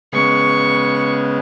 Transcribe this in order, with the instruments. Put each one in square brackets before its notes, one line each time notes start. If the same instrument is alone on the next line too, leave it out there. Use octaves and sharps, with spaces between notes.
[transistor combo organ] C#3 G#3 B3 [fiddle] C#6